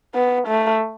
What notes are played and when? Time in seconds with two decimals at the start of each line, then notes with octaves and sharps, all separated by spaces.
0.14 B3
0.47 A3